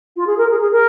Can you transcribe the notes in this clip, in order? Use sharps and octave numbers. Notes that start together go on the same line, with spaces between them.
F4
G#4
A#4
G#4
G#4
A#4